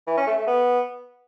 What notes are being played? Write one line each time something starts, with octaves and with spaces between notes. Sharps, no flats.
E3
C#4
A3
A3
B3